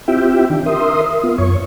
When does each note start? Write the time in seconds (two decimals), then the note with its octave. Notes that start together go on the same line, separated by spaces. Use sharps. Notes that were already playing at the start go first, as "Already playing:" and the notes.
0.08 C4 E4 F4 G4 E5 G5
0.50 D#3 D4
0.66 A#4 E5 C6 D#6
1.23 B3 F4
1.38 F#2 C#5 C#6